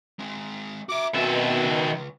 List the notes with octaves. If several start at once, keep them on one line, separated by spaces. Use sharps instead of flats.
G#3 C4
F#4 E5 D6
B2 D#3 B3 C4 E5
C#2